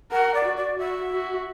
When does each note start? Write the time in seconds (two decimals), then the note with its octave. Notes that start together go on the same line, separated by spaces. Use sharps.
0.11 A#4 F#5
0.34 D5
0.45 F#4
0.57 D5
0.79 F#4 E5
1.13 F#4